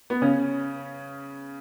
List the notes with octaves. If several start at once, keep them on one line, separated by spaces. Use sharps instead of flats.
B3
C#3 C#4